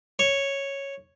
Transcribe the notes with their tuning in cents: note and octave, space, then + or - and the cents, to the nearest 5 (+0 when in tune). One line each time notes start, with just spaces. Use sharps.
C#5 -5